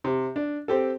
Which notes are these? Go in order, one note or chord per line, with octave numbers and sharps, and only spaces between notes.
C3
D4
C4 G4 A4